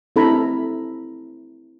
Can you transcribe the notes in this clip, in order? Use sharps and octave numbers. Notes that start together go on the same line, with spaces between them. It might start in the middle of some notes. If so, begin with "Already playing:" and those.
C4 E4 A4 A#5 B5